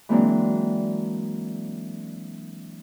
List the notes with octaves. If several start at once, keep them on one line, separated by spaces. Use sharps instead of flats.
E3 F#3 G#3 A#3 C4 D4